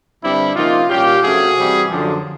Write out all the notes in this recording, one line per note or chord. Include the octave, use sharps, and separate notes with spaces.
G2 D3 G3 C4 D4 E4
C3 F3 A#3 C#4 D#4 F4
A#2 G3 A#3 C#4 F4 G4
C3 F3 A3 C#4 F#4 G#4
C3 E3 G3 C4
F#2 D3 F3